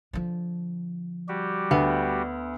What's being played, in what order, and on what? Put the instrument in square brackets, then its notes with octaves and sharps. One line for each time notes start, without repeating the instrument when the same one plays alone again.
[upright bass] D3 F3
[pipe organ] G3 F#4 G4
[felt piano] D2 [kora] B3